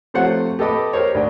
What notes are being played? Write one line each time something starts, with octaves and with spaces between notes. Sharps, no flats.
C3 F3 A3 C5 C#5 F#5
G4 A4 B4 D#5 B5 D6
G4 A#4 C5 C#5
D2 D4 G5